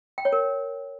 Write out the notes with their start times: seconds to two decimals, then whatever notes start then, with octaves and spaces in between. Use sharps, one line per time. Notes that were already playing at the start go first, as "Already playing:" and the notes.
0.18 G5
0.25 C#5
0.32 A#4